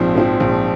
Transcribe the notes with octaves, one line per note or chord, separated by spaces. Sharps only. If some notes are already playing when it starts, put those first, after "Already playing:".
Already playing: A#1 G#2 F3 C4
G#2 F3 C4
A#1